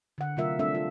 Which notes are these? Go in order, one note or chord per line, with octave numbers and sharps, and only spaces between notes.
D3 F#5
C3 F#3 A3 F4 A#4 E5
G3 A3 C4 D4 A4 E5
F4